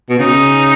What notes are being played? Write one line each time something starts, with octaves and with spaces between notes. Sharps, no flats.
B2
C#3 D#4